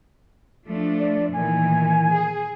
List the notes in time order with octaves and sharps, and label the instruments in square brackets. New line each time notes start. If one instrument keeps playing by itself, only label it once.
[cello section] F3 A3 D4
[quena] D5
[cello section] A#2 D#3 E3 [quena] G#5
[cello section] G#4